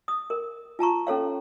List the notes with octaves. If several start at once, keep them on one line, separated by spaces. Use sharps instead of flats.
D#6
A#4
F4 A5 A#5 C#6
C#4 A4 C#5 F5